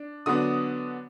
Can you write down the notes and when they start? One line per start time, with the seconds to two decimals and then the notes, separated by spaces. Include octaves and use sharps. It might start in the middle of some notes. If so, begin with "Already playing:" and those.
Already playing: D4
0.26 D3 F#3 B3 D4 D#6